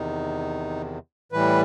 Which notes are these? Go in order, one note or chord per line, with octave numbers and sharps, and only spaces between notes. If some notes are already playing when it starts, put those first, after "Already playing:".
Already playing: E2 C3 D#3 D#4
A2 E3 G3 B4